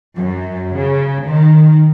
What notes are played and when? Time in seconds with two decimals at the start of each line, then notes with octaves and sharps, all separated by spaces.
0.16 F#2
0.76 C#3
1.27 D#3